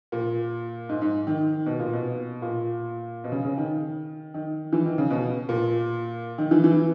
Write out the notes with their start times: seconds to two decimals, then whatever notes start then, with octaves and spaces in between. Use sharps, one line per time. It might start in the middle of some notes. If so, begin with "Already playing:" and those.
0.12 A#2
0.89 G#2
1.01 G#2
1.27 D#3
1.66 B2
1.79 A#2
1.93 B2
2.42 A#2
3.24 B2
3.32 C#3
3.45 C#3
3.58 D#3
4.34 D#3
4.73 E3
4.85 D#3
4.98 C#3
5.11 B2
5.49 A#2
6.38 D#3
6.51 E3
6.64 E3